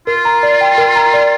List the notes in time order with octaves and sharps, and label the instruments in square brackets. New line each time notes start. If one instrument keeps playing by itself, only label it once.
[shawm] F4 [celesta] A#4
[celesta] A#5
D5
G5
A#4
A#5
D5